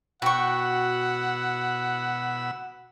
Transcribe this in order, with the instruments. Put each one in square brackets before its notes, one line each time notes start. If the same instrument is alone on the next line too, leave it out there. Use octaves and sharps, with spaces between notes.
[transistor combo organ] B2 B5 E6 [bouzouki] F#4 [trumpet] F#5 [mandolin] G5 C#6